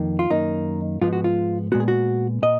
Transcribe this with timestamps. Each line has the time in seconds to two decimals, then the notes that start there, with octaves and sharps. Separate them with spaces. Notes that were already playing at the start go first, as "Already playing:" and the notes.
Already playing: F2 D#3 A#3
0.19 F4
0.30 F#2 D#3 A#3 D#4
1.01 G#2 F3 G#3 B3 F4
1.13 F#4
1.24 F4
1.72 A#2 G#3 B3 F#4
1.80 G#4
1.88 F#4
2.42 A#2 D#5